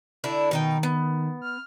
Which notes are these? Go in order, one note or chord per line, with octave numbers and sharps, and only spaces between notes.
D3 D4 E4
B2 D#3 D#4 G5
B3
F6